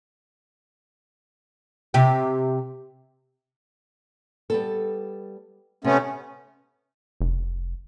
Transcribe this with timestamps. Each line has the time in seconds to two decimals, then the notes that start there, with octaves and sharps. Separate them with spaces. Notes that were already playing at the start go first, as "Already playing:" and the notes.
1.94 C3 G4
4.50 G3 B3 A4
5.84 C3 A3 B3 C#4
7.20 F1